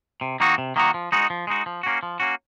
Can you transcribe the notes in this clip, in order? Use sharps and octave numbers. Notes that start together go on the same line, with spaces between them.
C3
D#3 A#3 D#4 F#4
C3
D#3 A#3 D#4 F#4
F3
G#3 D#4 F#4
F3
G#3 D#4 F#4
F3
A#3 C#4 F#4
F3
A#3 C#4 F#4